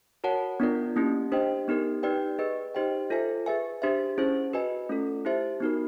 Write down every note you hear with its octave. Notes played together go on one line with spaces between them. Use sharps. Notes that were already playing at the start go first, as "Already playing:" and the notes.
F#4 A#4 C#5 F#5 A5
B3 D4 F4 A#4 D5
A#3 C#4 E4 G4
D4 G4 C5 D#5 G5
B3 D#4 G4 A#4
D#4 G4 B4 D5 G5
G#4 B4 D#5
D#4 G4 C5 D#5 G5
F4 A4 C5 E5 G#5
G#4 B4 E5 G#5
D4 G4 C5 E5
C#4 E4 G#4 C5
F#4 B4 D#5 G#5
A3 C#4 F4 A4
E4 G4 C5 E5
B3 D#4 F#4 A#4